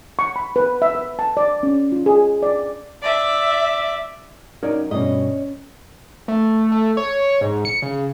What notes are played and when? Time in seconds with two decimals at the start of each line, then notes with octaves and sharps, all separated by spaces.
0.19 C#6
0.36 B5
0.56 B4
0.82 E5
0.95 B4
1.19 A5
1.37 D5
1.63 C#4
1.92 F4
2.06 G#4
2.43 D5
3.02 D5 E5
4.63 F#2 D#4 A#4 C#5 D5
4.91 G2 B2 C#4 D5 D#5
6.28 A3
6.72 A3
6.97 C#5
7.41 G#2
7.65 C#7
7.82 C#3